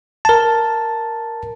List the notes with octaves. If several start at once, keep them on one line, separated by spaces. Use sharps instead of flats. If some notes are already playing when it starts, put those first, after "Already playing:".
A#4 A5